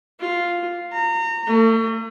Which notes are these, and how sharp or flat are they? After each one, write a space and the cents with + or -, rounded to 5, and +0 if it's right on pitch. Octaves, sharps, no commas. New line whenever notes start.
F4 +0
A#5 -30
A3 +40